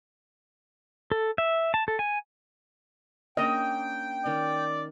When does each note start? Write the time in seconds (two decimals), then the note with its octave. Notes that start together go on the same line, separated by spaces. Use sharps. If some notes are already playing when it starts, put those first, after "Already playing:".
1.12 A4
1.38 E5
1.74 A5
1.88 A4
1.99 G#5
3.37 A#3 C#4 D4 D#5 G5
4.26 D#3 C#4 D5